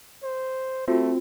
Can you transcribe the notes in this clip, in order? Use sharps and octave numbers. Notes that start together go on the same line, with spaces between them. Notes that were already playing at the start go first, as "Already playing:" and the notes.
C5
A3 C4 F4 F#4